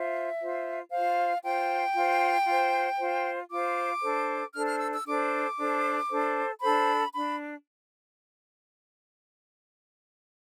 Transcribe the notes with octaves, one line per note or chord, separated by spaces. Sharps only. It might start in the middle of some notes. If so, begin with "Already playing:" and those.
Already playing: F4 C5 E5
F4 C5
F4 C5 F5
F4 C5 G5
F4 C5
F4 C5
F4 C5
F4 C5 D6
D4 A4 C5
D4 A4 C5 F6
F6
E6
E6
D4 A4 C5 D6
D4 A4 C5
D4 A4 C5
D4 A4 C5 B5
D4 B5